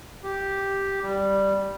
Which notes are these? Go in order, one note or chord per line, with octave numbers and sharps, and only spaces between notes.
G4
G3